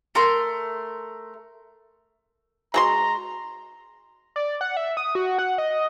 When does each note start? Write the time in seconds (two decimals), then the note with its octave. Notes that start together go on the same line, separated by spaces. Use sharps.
0.15 A3 A#4 C6
2.74 G#3 F#4 A#5 C6
4.36 D5
4.61 F#5
4.77 E5
4.97 D#6
5.15 F#4
5.38 F#5
5.58 D#5